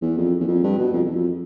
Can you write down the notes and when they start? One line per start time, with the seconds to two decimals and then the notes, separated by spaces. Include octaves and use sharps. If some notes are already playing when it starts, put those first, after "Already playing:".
0.02 E2
0.17 F2
0.40 E2
0.48 F2
0.63 G2
0.78 B2
0.93 F2
1.04 E2
1.16 F2